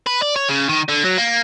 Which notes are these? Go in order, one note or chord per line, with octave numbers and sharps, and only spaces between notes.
B4
D5
C#5
C#3
D#3
D3
F#3
A#3